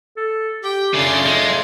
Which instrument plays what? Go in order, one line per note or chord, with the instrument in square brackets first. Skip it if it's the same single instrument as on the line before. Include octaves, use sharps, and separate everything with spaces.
[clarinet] A4
[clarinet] G4 [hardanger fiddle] G5
[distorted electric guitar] C#3 [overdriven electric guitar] A3 F4 [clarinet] D4 [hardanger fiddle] D5 C6
[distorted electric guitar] G#3